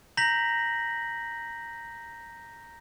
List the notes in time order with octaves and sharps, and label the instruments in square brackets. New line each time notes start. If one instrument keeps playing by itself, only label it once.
[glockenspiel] A#5 G6 A#6 B6 F#7